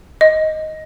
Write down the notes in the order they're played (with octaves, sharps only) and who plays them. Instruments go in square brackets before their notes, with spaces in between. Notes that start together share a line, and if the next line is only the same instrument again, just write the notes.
[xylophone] D#5